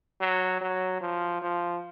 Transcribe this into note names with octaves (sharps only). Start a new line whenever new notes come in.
F#3
F#3
F3
F3